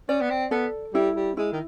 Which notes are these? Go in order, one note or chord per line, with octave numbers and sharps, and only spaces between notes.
C#4 D5
B3
C4
B3 A4
G3 E4
G3
G#3 E4
D#3